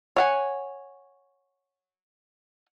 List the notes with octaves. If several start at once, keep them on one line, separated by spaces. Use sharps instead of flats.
C#5 F#5 G#5